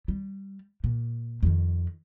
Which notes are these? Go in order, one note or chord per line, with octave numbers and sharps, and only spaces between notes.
G3
A#2
F2 D#3